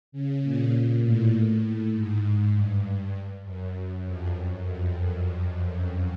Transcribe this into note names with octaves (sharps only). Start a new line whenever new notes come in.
C#3
A#2
A2
G#2
G2
F#2
F#2
F2
F#2
F2